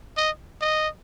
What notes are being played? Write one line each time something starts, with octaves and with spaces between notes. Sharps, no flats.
D#5
D#5